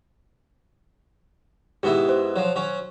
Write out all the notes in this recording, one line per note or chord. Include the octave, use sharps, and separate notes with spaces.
G#2 B3 E4 G4
C5
F3 F#3
F#3 C#4